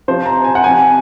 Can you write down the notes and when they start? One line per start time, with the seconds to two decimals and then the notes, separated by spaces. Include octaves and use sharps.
0.08 C3 F3 C5
0.26 A#5
0.44 G#5
0.55 F#5
0.64 C3 F3 G#5